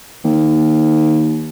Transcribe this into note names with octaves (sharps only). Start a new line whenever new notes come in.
D#2